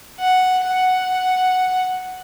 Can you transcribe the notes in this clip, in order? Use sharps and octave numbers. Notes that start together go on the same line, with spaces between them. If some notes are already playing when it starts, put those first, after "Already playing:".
F#5
F#5